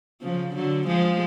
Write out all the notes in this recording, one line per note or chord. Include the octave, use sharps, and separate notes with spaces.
C#3 F3
D3 F#3
F3 G#3